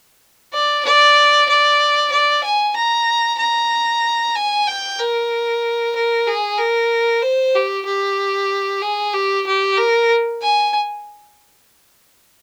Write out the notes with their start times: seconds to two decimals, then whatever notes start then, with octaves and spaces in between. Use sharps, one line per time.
0.53 D5
0.85 D5
1.49 D5
2.12 D5
2.44 G#5
2.76 A#5
3.39 A#5
4.35 G#5
4.67 G5
5.00 A#4
5.95 A#4
6.27 G#4
6.58 A#4
7.22 C5
7.55 G4
7.86 G4
8.82 G#4
9.13 G4
9.46 G4
9.77 A#4
10.42 G#5